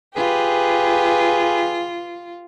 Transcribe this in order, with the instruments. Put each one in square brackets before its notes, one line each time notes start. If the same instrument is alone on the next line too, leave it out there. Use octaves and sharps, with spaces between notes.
[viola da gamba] F4 [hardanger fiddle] G4 B4 [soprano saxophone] G#4